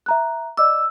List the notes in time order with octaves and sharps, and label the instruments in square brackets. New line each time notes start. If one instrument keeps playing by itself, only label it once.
[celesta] E5 A#5 F#6
[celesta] D5 D#5 D6 [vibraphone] E6